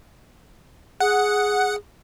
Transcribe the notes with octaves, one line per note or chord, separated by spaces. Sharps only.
G#4 F#5